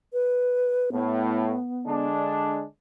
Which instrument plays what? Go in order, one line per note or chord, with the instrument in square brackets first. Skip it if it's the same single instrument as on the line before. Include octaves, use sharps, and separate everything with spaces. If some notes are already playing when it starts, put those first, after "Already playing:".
[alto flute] B4
[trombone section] A2 [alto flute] B3
[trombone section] D3 G#3 D4